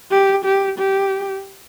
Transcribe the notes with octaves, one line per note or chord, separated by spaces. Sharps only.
G4
G4
G4